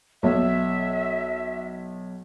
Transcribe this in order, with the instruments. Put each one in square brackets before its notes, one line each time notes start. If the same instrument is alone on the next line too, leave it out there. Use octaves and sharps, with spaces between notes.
[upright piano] B1 [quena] E5